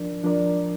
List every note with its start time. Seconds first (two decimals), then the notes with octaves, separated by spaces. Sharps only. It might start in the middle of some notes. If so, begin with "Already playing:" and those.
Already playing: F3 D4 A#4 D5
0.23 F3 D4 A#4 D5